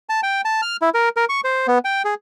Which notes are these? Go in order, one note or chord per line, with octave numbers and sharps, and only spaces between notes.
A5
G5
A5
F6
E4
A#4
A#4
C#6
C5
B3
G5
G#4